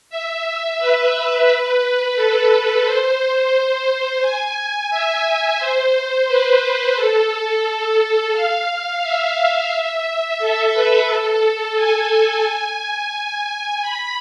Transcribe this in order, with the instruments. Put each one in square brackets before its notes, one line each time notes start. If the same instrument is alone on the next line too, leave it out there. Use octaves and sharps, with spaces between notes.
[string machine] E5
B4
A4
A4
C5
G#5
E5
C5
B4
A4
F5
E5
A4
B4
A4
G#5
G#5
B5